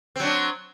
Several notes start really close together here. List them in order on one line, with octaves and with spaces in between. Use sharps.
C4 F#3 D4